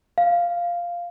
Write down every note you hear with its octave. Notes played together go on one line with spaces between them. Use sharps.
F5